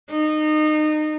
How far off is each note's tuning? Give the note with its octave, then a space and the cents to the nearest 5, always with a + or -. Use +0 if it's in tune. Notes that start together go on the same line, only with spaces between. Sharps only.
D#4 -25